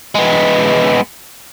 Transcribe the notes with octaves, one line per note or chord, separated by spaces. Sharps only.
G#3 B3